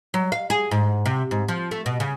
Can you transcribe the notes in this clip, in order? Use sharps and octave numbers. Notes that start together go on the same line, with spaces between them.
F#3
F5
G#4
G#2
C3
G#2
F3
A3
B2
C#3